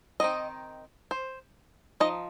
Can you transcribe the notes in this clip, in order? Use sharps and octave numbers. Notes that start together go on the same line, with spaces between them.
D#3 C4 D#4 D#5
C5
F3 D#4 D#5